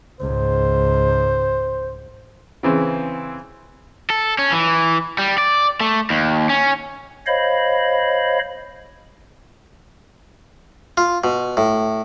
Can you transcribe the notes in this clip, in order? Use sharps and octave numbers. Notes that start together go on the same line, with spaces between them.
C#2 G#2 C5
C#3 E3 C4
A4
C#4
E3
G3
D5
A3
D#2
C#4
C5 C#5 D#5 F5 B5
F4
B2
A2